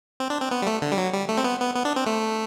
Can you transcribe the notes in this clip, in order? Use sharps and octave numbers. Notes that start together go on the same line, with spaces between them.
C4
D4
C4
B3
G3
A3
D3
G3
F#3
G3
A3
C4
B3
B3
B3
D4
C4
A3